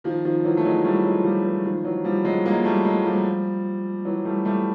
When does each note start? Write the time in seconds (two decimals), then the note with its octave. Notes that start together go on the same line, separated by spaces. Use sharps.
0.04 D#3 F3
0.25 D#3 F3
0.44 E3 F#3
0.57 A3
0.65 F#3 G#3
0.84 G3 A3
1.05 F#3 G#3
1.24 F3 G3
1.44 E3 F#3
1.65 D#3 F3
1.84 E3 F#3
2.04 F3 G3
2.25 F#3 G#3
2.46 G#3 A#3
2.65 G3 A3
2.85 F#3 G#3
3.05 F3 G3
4.05 E3 F#3
4.25 G3 A3
4.45 G3 A3